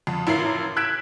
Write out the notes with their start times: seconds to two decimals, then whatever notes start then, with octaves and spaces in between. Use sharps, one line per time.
0.07 F2
0.27 A1 E4 F4 A#4 C7 F#7
0.76 E6 F#6 G#6 B6 D7 E7